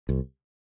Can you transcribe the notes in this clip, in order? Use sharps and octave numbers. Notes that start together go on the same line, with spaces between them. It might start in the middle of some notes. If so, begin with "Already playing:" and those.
C2